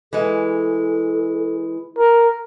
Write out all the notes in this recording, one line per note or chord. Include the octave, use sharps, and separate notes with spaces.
E3 G#3 A4
A#4